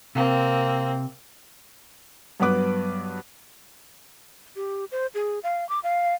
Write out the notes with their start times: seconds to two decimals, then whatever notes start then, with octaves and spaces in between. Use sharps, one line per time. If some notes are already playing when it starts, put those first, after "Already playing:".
0.15 C3 A#3 C4
2.40 G2 F#3 B3 B4 D6 F#6
4.56 G4
4.92 C5
5.14 G#4
5.44 F5
5.69 D6
5.84 F5